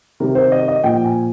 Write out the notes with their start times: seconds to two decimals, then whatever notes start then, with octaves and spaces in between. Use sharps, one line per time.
0.20 C3 D#3 G3 A#4
0.35 C5
0.52 D#5
0.68 D#5
0.84 A#2 F3 G5
1.04 G#5